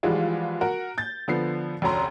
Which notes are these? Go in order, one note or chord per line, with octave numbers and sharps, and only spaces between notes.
E3 F3 G3 G#3 F4 F#4
F#4 A#4 F#5
G6 A6
D3 F3 B3 C7
F1 D2 C#4 A#5 C6